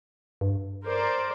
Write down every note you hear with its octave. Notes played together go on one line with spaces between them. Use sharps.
G2
A#4 C5 D5